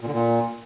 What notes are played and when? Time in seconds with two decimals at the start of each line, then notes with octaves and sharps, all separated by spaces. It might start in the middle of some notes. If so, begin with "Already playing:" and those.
0.01 A#2
0.07 D3
0.13 A#2